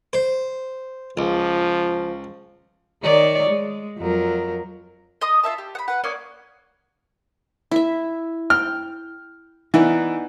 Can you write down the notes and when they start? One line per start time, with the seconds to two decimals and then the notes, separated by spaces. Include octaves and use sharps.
0.13 C5
1.17 C#2 F3
3.03 D#3 C#5 D5
3.50 G#3
3.98 F2 F#3 A#4
5.21 D#5 C6 D#6
5.43 F4 C#5 E5 A5
5.58 G4
5.75 F#5 B5
5.88 B4 F#5
6.04 A#3 C#4 D5 D#5
7.71 E4 E5
8.50 G5 F6
9.74 E3 B3 D#4 D5